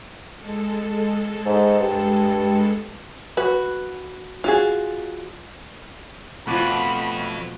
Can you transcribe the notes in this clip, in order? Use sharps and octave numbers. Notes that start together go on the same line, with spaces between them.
G#3 A4
G#2
G2
F#4 B4
F4 F#4 G#4
F2 B2 F3 A3 F#4 B5 D6